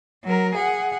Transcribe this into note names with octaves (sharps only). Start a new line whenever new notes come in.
F#3 A#4
G#4 F#5